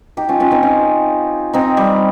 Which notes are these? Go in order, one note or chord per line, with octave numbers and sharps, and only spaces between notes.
D#4 G4
C#4 F4
C#4 F4
C4 D#4
C#4 F4
C4 D#4
G3